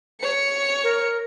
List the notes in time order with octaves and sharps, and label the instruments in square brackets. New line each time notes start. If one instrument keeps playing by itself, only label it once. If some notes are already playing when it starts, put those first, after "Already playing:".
[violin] C#5 C#7
[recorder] A#4